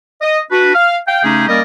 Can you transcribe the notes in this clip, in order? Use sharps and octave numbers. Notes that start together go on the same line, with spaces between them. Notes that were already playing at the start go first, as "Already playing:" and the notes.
D#5
D4 F#4 B4
F5
F5 G5
C#3 A3 C#4 D#4 G4 G#4
G3 A#3 C#4 A#4 D5 D#5